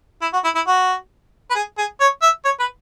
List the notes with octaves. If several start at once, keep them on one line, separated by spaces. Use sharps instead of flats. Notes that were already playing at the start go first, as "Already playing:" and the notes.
E4
F#4
E4
E4
F#4
B4
G#4
G#4
C#5
E5
C#5
B4